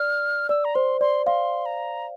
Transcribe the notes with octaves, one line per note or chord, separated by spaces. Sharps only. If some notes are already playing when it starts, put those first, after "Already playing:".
Already playing: D5 F6
D5 E6
A#5
C5 C6
D5 C6
F5 C6
A#5